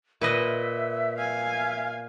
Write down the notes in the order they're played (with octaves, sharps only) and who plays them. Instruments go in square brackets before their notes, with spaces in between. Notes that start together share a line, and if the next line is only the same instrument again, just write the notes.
[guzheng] A#2 B4 D#5 [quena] E5
[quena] E5 [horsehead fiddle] F5 G#5